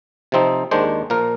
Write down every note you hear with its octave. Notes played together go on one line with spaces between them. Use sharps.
C3 F3 C4 D#4
D#2 D#3 G#3 D4 C5
A#2 F3 A#3 A#4